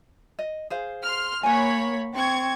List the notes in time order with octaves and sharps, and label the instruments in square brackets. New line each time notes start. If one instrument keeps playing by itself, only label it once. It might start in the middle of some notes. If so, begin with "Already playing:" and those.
[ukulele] D#5
G#4 C5 F5
[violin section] C6 F6
[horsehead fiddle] A#3 [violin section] C#5 B5 [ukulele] F#5 G#5
[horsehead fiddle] C4 [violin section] C#6 G#6